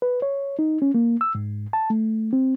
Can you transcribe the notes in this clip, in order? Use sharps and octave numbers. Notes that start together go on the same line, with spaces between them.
B4
C#5
D#4
C#4
A#3
E6
G#2
A5
A3
C4